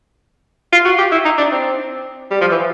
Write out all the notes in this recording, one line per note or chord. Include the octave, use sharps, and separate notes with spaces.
F4
F#4
G4
E4
D#4
D4
C4
G3
F3
E3